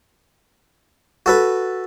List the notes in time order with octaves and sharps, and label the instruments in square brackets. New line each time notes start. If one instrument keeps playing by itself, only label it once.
[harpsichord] F#4 A4 B4